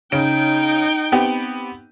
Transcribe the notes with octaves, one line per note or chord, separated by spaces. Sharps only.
C#3 D#4 G5 D7
B3 C4 G4